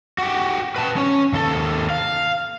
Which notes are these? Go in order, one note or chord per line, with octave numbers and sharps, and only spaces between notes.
F#4 G4
B4 A5
C#4 C#5
D#2 A4
F5